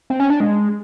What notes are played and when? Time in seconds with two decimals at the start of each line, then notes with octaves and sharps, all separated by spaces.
0.10 C4
0.20 C#4
0.30 D4
0.40 G#3